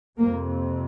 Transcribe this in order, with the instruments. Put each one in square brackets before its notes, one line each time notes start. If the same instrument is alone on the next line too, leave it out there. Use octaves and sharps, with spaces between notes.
[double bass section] F2 C3 A#3